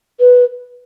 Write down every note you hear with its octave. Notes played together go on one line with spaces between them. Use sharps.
B4